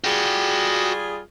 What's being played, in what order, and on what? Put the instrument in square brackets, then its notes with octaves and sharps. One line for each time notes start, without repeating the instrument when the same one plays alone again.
[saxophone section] G3 F4 G#4 [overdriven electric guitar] F#4 G5